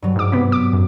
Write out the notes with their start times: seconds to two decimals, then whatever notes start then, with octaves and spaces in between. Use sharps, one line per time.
0.02 G2 F#3
0.16 G#2 D6
0.32 C3 B3 B6
0.52 D6
0.73 F#2